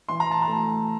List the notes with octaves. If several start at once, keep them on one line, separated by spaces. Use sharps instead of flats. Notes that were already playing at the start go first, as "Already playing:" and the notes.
E3 C6
A#5
A5
A#5
A3